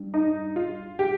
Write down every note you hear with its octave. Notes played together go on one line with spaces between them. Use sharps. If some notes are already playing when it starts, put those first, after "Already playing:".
Already playing: G2
D#4
F4
G4